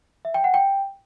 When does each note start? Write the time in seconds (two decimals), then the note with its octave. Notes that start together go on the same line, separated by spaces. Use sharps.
0.25 E5
0.34 G5
0.44 F#5
0.54 G5